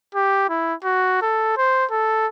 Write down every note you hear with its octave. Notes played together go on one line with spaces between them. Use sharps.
G4
E4
F#4
A4
C5
A4